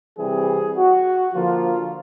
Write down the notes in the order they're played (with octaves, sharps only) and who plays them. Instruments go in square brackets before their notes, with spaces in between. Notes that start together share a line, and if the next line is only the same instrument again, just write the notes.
[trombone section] C3 E3 G3 C4 G#4
F#4
D3 F3 A#3 F4